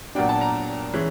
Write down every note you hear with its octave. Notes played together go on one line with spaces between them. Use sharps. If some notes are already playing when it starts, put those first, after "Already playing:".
A#2 F#3 B3 D4 G5
A5
A#5
E3 G#3 C#4 E4